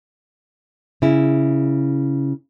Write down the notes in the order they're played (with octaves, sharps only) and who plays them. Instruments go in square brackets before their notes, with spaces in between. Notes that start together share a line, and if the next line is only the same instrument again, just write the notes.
[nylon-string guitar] C#3 E4